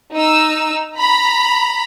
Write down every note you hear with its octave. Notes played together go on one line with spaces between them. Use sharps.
D#4 E6
A#5 B5